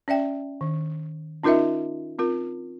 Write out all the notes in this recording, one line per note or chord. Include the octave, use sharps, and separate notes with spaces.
C#4 D5 E5 G5
D#3
C#4 D#4 F4 A#4 D#5 E5
C4 F4 A#4